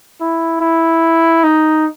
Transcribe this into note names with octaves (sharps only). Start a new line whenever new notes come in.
E4
E4
D#4